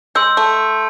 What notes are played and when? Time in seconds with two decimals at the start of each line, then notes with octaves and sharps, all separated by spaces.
0.15 G#3 C6 E6 G6
0.37 A3